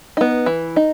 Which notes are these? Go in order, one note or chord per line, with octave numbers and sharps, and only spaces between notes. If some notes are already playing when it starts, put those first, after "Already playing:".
B3 D#4
E3
D#4